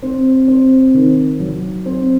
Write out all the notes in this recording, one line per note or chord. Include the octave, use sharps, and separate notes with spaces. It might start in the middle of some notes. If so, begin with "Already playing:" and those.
C4
C4
D#3
F#3
C4